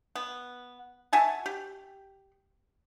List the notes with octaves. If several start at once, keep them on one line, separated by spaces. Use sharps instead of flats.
B3
F#4 E5 G#5 A5
G4